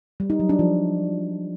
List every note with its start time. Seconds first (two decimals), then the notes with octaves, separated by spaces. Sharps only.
0.20 G3
0.30 D#4
0.40 F#3
0.49 D4
0.59 F3